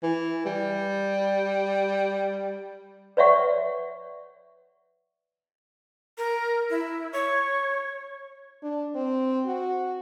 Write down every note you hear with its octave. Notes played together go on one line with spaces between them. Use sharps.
E3
G3
B4 C#5 D5 E5 F#5 C#6
A#4
E4
C#5
D4
C4
F#4